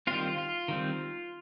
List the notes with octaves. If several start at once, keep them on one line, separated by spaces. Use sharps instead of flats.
D#3 G3 C4 F4
F4
D#3 G3 C4